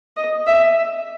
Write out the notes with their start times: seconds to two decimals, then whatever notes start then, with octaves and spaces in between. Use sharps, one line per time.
0.17 D#5
0.47 E5